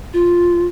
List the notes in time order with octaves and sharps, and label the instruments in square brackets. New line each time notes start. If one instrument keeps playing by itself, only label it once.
[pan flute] F4